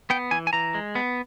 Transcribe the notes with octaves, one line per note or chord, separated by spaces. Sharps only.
B3 G5
E3 G#5
G#5
E3 A#5
G#3
B3